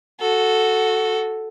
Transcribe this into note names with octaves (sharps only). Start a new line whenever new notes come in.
F#4 A4